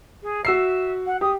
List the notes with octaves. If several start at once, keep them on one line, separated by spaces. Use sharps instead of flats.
G#4
F#4 E5 E6 C7
F#5
G4 D#6